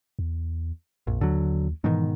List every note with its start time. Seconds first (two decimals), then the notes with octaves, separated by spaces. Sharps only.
0.19 E2
1.07 A#1 F2
1.21 D#2 D3 F#3
1.84 G#2 B2 D#3 E3